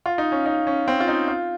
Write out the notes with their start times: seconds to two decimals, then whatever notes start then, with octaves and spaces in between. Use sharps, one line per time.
0.06 F4
0.18 D#4
0.32 C#4
0.46 D#4
0.67 C#4
0.88 C4
1.00 F4
1.08 D#4
1.28 F4